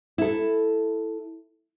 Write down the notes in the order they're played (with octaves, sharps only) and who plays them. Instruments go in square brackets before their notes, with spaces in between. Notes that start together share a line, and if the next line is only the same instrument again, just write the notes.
[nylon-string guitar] E4 A4